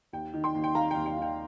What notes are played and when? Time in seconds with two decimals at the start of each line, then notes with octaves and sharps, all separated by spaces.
0.13 D#2 G5
0.34 D#3
0.44 G5 C6
0.55 D#2
0.64 G5
0.75 D#3 F5 A#5
0.91 G5
0.96 D#2
1.06 G5
1.16 D#3
1.22 G5